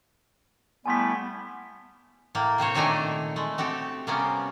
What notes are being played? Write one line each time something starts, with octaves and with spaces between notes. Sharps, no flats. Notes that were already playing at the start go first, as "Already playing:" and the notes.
G3 A3 B3 E4 G#5 C6 B6
A2 A#3
C3 C4 C5 C#5
A#2 D#3 A3 D4 G#5 A#5
G#3 A3
C4 F#4 G4 A4
C3 G3 A#3 B3 C#4